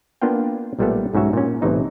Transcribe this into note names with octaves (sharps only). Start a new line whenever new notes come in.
A#3 B3 D4 F4 F5 G5
B1 A#2 G3 A3 B3 A4
B1 G#2 C#4 F#4 E5
A#2 C#4
B1 A2 C3 E3 D#4